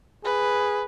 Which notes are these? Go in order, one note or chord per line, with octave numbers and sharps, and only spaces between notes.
G#4 B4